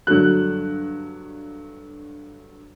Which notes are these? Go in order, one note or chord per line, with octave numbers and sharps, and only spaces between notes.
G2 D3 F#3 F#6